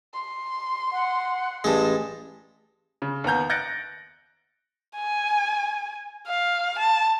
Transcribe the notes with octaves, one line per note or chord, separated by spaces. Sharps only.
C6
F#5
A1 G2 G#3 A5
C#3
D#2 B3 A#5 G6
F#6 G6 A6 A#6 C#7 D7
G#5
F5
A5